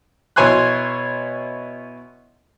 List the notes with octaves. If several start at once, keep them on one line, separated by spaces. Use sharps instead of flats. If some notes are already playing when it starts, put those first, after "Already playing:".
B2 E4 C#5 G#5 C6 F#6